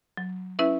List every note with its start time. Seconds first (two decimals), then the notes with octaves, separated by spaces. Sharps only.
0.17 F#3
0.59 C#4 E4 B4 E5